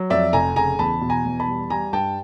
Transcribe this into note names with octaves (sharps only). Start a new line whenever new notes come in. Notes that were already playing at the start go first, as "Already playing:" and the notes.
Already playing: F#3
F2 D5 E5
F1 G#5 A#5
C#3 G#5 A#5
E2 A5 B5
B2
G#5 A#5
E2
A5 B5
G3
G3 G#5 A#5
G2 G5 A5